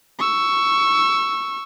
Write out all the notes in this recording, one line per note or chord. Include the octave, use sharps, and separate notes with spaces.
C#6 E6